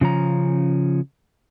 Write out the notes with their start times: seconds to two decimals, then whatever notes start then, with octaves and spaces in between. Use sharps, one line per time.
0.01 C#3 F3 C#4 A#5